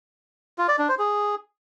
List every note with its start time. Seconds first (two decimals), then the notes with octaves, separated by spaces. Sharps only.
0.58 F4
0.68 D5
0.78 D4
0.89 C5
0.99 G#4